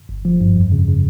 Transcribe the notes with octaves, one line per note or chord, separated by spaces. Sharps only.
G1
F3
G2
F2
C#3
C#3